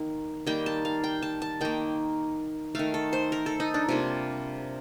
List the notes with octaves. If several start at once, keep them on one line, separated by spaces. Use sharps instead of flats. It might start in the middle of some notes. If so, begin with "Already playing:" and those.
Already playing: D#3 A#3
D#3 G3 A#3 G5
A5
F5
G5
A5
A5
D#3 A#3 G5
D#3 A3 F5
A4
C5
A#4
A4
D#4
D4
C3 G3 A#3 F4